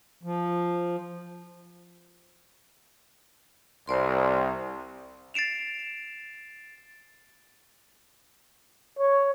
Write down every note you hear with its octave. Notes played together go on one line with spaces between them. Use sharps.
F3
C2 C5 D5 C6
A6 C7 D7 E7 F7
C#5